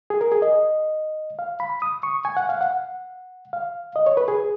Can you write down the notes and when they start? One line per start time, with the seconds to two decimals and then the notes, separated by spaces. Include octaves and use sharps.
0.10 G#4
0.21 A#4
0.32 G#4
0.42 D#5
1.39 F5
1.60 B5
1.82 D#6
2.03 C#6
2.25 G#5
2.37 F#5
2.49 F5
2.61 F#5
3.53 F5
3.96 D#5
4.06 C#5
4.17 B4
4.28 G#4